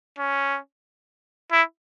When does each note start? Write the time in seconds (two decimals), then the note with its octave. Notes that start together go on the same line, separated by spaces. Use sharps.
0.18 C#4
1.52 E4